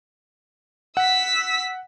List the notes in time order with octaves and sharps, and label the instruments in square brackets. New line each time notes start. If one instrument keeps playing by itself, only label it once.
[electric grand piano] F#5 [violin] E6 B6